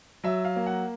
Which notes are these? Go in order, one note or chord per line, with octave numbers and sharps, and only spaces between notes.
F#3 E5
F5
A#3
F#5